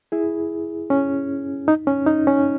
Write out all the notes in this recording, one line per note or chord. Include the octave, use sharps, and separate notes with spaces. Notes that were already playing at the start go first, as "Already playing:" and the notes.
E4 G#4
C#4
D#4
C#4
D#4
C#4